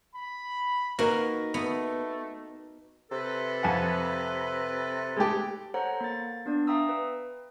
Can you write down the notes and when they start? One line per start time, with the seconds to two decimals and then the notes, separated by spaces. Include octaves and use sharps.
0.15 B5
0.99 A#3 D#4 F#4 A#4 B4 D#5 A#6
1.54 A3 B3
3.11 C3 A4 B4
3.63 F2 F#5
5.16 G#3 A3 G4
5.74 A4 C5 C#5 F#5 A#5
6.01 A#3 A6
6.46 B3 D4 D5
6.67 E5 F5 G5 A#5 D#6 E6
6.89 B4